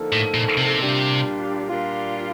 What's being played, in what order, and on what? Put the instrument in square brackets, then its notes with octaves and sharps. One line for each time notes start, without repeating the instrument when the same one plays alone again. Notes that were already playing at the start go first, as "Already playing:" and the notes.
Already playing: [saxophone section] D3 F3 A#3 D#4 A4
[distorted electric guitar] A2
A#2
C3
[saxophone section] A#2 G3 D4 F4
A#2 G3 D4 F4